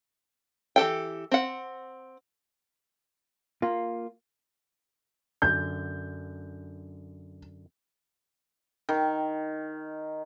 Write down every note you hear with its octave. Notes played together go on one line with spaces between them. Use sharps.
E3 G4 A4 G5
C4 F#5
A#3 F4
F#2 D3 G6
D#3